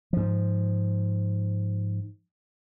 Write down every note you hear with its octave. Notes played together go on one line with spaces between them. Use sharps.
G#2 F3